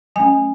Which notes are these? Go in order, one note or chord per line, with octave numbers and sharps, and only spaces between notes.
F#3 A3 C#4 G#5